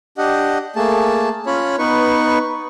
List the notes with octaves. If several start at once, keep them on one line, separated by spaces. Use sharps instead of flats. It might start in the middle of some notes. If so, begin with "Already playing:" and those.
D4 G4 D#5 F#5
A3 A#3 G#4 A5
C#4 F4 C#5 B5
B3 D#4 B4 C#6